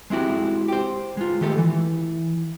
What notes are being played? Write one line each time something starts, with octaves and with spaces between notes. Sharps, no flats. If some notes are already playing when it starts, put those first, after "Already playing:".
G#3 C4 E4 F#4 G4
G4 C5
G#3 F4
D#3 A3 G4 A4
E3